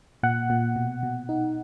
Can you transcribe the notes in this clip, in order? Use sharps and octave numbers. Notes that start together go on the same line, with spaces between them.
A#2 F#5
A#2
B2
B2
D#4